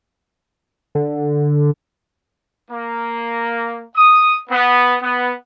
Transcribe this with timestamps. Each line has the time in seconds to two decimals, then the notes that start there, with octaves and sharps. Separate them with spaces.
0.95 D3
2.71 A#3
3.96 D#6
4.50 B3
5.02 B3